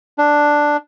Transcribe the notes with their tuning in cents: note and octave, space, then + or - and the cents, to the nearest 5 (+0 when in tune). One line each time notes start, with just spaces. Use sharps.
D4 +5